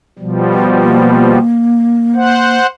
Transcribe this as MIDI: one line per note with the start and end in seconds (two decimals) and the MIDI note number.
0.19 1.39 47
0.19 1.39 53
0.19 1.39 55
0.81 2.58 58
2.15 2.67 72
2.15 2.67 78